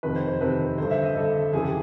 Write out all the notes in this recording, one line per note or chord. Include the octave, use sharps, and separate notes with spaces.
F2 C3 D#3 B4
C5
C5
F2 C3 D#3 B4
G2 D3 C5
E5
D#5
G2 D3 A4
F2 C#3 E3 G#4
G4